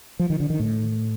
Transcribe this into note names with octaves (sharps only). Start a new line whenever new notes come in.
F3
D#3
D3
D#3
A2